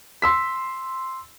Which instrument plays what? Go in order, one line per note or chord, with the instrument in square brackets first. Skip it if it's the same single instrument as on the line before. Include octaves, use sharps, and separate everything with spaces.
[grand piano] C6 E6 B6